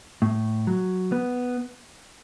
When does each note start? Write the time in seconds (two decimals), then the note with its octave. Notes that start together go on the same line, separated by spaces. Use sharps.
0.22 A2
0.67 F#3
1.12 B3